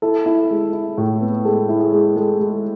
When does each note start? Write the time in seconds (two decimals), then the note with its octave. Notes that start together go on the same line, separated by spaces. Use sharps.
0.02 E4 A4
0.26 E4
0.50 G#3
0.73 E4
0.97 A2
1.21 B3
1.45 G#3 A4
1.69 E4
1.80 G#4
1.92 G#3
2.16 G#3 A4
2.40 G#3